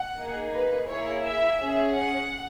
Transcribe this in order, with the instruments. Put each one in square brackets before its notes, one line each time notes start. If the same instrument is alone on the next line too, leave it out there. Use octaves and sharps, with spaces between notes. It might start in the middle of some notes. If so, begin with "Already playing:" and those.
Already playing: [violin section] F#5
A#3 D#4 G#4
B4
A#3 E4 G#4 C#5
E5
C#4 G#4
F#5